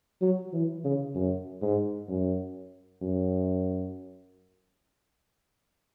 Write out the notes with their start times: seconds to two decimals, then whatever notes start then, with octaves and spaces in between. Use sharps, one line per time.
0.21 F#3
0.53 E3
0.84 C#3
1.15 F#2
1.61 G#2
2.09 F#2
3.01 F#2